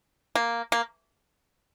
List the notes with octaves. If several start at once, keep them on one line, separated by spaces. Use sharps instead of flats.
A#3
A#3